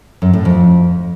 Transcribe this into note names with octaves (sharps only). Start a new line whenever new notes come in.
F#2
A2
F2